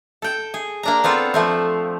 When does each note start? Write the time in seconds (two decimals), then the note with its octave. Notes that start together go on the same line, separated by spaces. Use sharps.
0.22 A4 G5
0.54 G#4
0.83 A#3 D4 A#5
1.04 B3 C4 F4 A4
1.34 F3 A3 C4